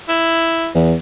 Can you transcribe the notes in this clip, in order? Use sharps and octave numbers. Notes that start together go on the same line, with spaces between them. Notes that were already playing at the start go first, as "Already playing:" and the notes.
E4
E2